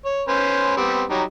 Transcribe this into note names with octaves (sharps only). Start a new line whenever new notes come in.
C#5
C#4 B4 C5
G3 B3 C4
F#3 G3 D#4